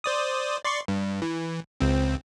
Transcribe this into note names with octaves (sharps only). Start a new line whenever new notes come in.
C5 D5 D#6
D5 C6 C#6
G2
E3
C#2 C4